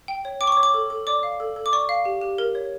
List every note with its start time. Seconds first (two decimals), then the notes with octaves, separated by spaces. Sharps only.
0.08 G5
0.25 C#5
0.41 G5 D6
0.47 C#6
0.52 D6
0.57 C#5
0.63 D6
0.74 A4
0.90 A4
1.07 D5 D6
1.23 F5
1.40 A4
1.56 A4
1.66 D6
1.73 D5 C#6
1.89 F5
2.05 G4
2.22 G4
2.38 A#4
2.55 C#5